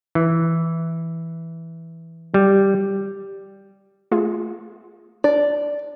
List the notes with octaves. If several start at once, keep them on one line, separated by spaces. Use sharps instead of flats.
E3
G3
A3 F4 G#4
D4 D5